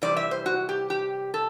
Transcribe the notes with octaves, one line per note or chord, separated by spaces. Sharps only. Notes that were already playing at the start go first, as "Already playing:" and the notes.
C3 E3 G3 D5
E5
C5
F#4
G4
G4
A4